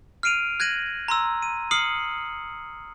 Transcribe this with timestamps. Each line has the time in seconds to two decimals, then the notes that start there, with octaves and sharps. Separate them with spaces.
0.23 F6 C7 D7 D#7 F7
0.60 F#6 G#6 A#6 D#7 F#7
1.08 A#5 C6 E6
1.42 D#7
1.71 D#6 F6 C7 C#7 F#7